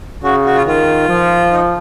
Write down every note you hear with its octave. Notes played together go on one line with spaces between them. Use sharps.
C#3 F#4
F#4
F4
D#3 F4
F3
D#4